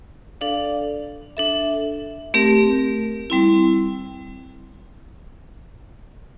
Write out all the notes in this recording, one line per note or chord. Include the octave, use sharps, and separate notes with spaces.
D4 A4 D5 F5
D4 A4 E5
A3 C4 G4 A#4
G3 C4 E4